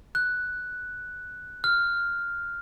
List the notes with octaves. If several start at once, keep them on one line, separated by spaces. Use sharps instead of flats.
F#6
F6